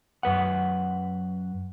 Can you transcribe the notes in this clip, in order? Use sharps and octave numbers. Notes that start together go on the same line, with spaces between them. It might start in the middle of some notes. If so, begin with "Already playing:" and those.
F#2 B4 F#5